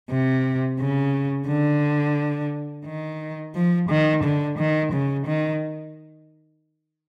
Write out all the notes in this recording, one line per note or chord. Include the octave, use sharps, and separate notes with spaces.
C3
C#3
D3
D#3
F3
D#3
D3
D#3
C#3
D#3